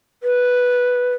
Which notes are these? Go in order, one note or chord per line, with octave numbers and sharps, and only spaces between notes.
B4